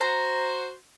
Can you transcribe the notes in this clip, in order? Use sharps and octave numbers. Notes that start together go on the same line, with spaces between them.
F#4 C5 A#5